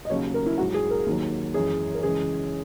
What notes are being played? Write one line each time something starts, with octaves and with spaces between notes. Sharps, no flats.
D#5
D#2 C#3 F#3 C#5
A#4
E4
G#2 F#3 F#4
G#4
A#4
D#2 D#3 F#3
F#2 E3 G#3 G#4
A#4
F#2 C#3 E3 G#3 G#4